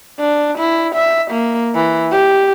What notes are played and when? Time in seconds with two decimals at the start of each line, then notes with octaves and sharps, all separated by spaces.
0.19 D4
0.58 E4
0.95 E5
1.31 A#3
1.75 E3
2.12 G4